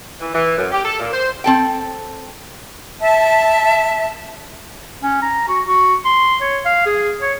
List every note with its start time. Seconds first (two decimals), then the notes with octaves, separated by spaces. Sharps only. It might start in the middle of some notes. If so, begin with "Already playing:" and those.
0.20 E3
0.34 E3
0.57 F#2
0.72 G4
0.84 A4
1.00 A#2
1.12 C5
1.44 C4 A4 G5
3.00 E5 A5
5.02 C#4
5.23 A#5
5.48 F#4
5.67 F#4
6.05 C6
6.41 C#5
6.66 F5
6.86 G#4
7.22 C#5